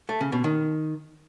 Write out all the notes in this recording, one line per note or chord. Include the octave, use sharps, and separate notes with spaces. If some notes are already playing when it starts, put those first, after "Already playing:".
A3
C#3
B2
D#3